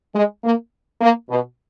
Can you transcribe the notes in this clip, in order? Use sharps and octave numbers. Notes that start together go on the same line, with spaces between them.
G#3
A#3
A#3
B2